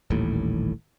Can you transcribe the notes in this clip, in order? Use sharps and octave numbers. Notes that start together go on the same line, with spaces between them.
D#1 A1 D#2 A2